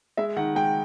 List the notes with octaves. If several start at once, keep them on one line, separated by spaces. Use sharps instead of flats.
G#3 E5
D#3 F#5
G#3 G5